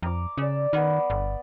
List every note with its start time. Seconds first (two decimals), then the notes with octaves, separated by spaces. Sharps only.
0.02 F2 A#5 D6
0.38 C#3 D5 E6
0.73 D#3 B3 B5
1.10 G1